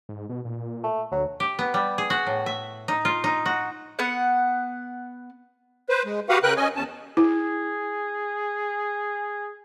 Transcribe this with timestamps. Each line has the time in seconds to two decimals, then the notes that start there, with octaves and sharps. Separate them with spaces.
0.09 G#2
0.29 B2
0.45 A#2
0.83 A3
1.12 D2 F#3
1.40 G4
1.59 B3
1.74 G3
1.98 G#4
2.10 F#4
2.27 A2
2.46 E5
2.88 D#4
3.05 F4
3.24 D#4
3.46 F#4
3.99 B3 F#5
5.89 B4 C5
6.05 G#3
6.29 F#4 G4 B4 F5 F#5
6.43 C#3 A#4 B4 G5 F#6
6.56 C#4 D#5 G#5
6.76 E2 C#4 A5
7.17 E4 G#4